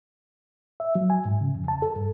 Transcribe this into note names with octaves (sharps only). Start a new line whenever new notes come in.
E5
F#3
G#5
G#2
C#3
F2
A5
A4
G2